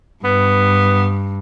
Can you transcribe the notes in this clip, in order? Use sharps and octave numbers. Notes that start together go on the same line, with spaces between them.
G2 B3